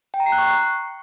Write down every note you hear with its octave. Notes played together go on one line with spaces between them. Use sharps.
G5
A#5
C7
F#6
C#6